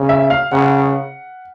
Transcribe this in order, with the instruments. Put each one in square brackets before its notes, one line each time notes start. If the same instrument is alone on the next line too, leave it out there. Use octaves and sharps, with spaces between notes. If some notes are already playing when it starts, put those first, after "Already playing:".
Already playing: [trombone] C#3
[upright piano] E5
F5
[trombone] C#3 [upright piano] F#5